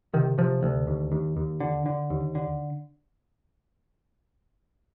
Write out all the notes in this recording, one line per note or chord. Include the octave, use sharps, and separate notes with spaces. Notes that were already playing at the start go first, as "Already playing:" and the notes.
C3 D#3
C3 F3
D2
D#2
D#2
D#2
D3
D3
D#2
D3